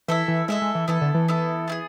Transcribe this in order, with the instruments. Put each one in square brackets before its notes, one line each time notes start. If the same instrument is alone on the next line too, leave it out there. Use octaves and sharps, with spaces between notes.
[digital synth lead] E3 [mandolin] E4 A4 E5
[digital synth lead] E3
[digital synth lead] G#3 [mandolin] E4 A4 E5
[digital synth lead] G#3
E3
[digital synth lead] E3 [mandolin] B3 E4 A4
[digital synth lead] D3
E3
[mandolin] B3 E4 A4
B3 E4 G#4